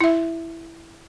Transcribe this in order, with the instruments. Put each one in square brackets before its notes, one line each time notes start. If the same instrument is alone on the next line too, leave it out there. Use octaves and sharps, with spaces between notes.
[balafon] E4 E5